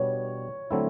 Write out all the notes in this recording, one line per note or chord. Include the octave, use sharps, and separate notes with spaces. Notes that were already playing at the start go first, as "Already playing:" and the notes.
Already playing: B2 G3 B3 D4 C#5
D3 F#3 A3 C4 E4